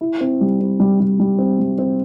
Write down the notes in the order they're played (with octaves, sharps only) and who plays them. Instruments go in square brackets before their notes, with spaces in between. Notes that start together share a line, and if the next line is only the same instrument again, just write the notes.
[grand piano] E4
C4
G3
C4
G3
G3
G3
C4
G3
C4